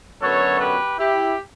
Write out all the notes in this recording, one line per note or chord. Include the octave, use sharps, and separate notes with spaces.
F#2 D3 F#3 B3 A4 C#5
G4 B4
E4 G4